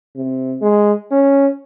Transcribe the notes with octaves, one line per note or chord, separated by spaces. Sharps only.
C3
G#3
C#4